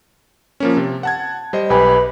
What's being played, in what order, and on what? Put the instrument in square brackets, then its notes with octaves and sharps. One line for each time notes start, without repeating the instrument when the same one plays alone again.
[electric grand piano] F3 A#3 C#4
C3
F#5 A5 G#6
G3 C5 D#5
[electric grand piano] B1 G4 G#5 [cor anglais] B4